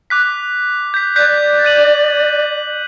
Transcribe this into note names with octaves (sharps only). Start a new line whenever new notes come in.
D6 F#6 B6
G6 B6
D5 F#6 G6 B6
G6 D#7 F#7